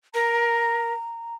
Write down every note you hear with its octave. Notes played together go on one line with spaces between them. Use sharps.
A#4 A#5